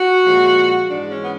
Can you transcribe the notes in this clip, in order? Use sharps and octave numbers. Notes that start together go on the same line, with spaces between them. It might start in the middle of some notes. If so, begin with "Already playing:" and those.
Already playing: F#4
A#2 F3 G#3
G#2 E3 G#3 D4
C#4
B3